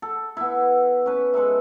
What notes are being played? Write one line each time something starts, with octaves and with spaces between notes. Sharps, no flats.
A4
B3 E4
C#4 B4
G#3 A4 B4 E5